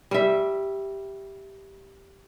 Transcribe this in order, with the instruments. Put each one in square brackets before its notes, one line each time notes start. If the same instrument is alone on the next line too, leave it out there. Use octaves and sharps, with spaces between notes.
[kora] G3 E5